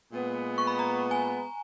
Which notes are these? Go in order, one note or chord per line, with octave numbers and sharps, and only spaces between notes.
A#2 G#3 B3
C#6
B5
A#5
G#5